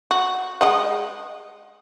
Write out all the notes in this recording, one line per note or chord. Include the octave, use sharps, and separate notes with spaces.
F#4
G#3 D#5 F#5